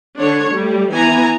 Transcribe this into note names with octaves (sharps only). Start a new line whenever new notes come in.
D3 D4 C#5
G3 A3
E3 B3 G#5 A#5